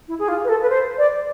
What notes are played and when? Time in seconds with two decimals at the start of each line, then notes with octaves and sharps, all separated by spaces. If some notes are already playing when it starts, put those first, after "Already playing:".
0.08 E4
0.19 G#4
0.28 F4
0.44 B4
0.49 A4
0.62 B4
0.70 C5
0.98 D5